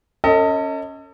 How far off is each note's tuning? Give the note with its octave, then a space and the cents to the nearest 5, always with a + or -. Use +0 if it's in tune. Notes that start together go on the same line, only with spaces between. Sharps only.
C#4 +0 A4 +40 D#5 +25